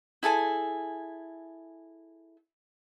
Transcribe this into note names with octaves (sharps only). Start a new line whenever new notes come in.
E4 G#4 A4 G#5